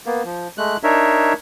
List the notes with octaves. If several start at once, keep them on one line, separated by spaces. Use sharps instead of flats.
A#3 B3
F3
G#3 A3 F#6
D4 D#4 A#4 C#5 E5